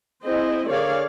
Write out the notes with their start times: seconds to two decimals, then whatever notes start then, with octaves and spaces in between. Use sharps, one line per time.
0.24 C4 E4 G#4 C5 D#5
0.69 D3 G#4 A#4 C#5 D5 F5